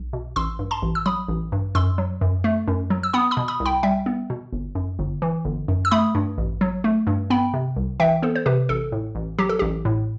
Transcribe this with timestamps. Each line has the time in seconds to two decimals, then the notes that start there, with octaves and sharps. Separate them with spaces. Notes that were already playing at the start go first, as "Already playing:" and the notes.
Already playing: B1
0.13 B2
0.36 A1 C6 E6
0.59 G2
0.71 A5 C6
0.82 A1
0.95 E6
1.06 F#3 B5 D#6
1.28 A1
1.52 G2
1.75 F#2 C6 E6
1.98 F#3
2.21 F#2
2.44 A3
2.68 F#2
2.90 F#3
3.03 E6
3.13 B3 B5 D#6
3.31 B5 D#6
3.37 B2
3.48 B5 D#6
3.60 C2
3.66 G5 B5
3.83 G3 E5 G5
4.06 B3
4.30 B2
4.52 G1
4.75 F#2
4.99 G1
5.22 E3
5.45 G1
5.68 F#2
5.85 E6
5.91 A3 B5 D#6
6.15 G2
6.38 A1
6.61 F#3
6.84 A3
7.07 G2
7.30 B3 G5 B5
7.54 C3
7.76 C2
8.00 E3 E5 G5
8.23 B3 A4 C5
8.35 C5
8.46 C3 G4 B4
8.69 A1 A4
8.92 A2
9.15 A1
9.39 F#3 G4
9.49 A4
9.59 A1 G4
9.85 A2